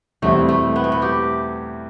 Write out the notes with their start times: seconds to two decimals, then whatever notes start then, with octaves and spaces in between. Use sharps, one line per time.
0.22 E2 B2 G3 A3 C4 E4
0.49 A3
0.76 B3
0.84 A3
0.92 B3
1.02 G4